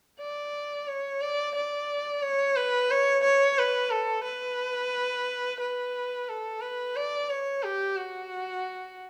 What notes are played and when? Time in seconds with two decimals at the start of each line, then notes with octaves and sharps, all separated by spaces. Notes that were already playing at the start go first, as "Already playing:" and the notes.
0.20 D5
0.88 C#5
1.21 D5
1.55 D5
2.22 C#5
2.56 B4
2.90 C#5
3.23 C#5
3.58 B4
3.92 A4
4.24 B4
5.60 B4
6.28 A4
6.61 B4
6.96 D5
7.29 C#5
7.63 G4
7.96 F#4